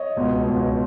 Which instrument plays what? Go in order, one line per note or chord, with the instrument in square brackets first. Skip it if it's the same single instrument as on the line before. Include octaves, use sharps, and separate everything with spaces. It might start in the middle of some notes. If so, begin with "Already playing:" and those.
Already playing: [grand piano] C#5 D#5
C#2 B2
C#2 B2